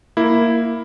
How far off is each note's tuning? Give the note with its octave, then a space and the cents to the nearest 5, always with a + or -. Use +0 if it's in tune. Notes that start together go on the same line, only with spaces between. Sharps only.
A#3 +0 E4 +0